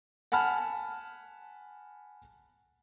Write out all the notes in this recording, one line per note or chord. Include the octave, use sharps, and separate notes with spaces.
F#5 G#5 A5 B5 F6